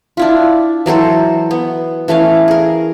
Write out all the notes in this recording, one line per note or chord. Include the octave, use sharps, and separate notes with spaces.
D4 E4 F4
E3 F#3 A4 C5
B3
E3 A3 C#4 F5
G#4 A#4